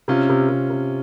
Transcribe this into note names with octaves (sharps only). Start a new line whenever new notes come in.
C3 C#4 F4
C3
C3
C3